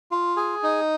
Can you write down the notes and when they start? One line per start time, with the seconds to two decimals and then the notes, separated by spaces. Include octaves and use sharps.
0.11 F4
0.37 G#4
0.63 D#4